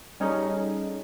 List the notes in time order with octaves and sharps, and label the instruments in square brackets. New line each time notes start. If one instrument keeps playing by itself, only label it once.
[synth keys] G3 C#4 D#4 G#4 A4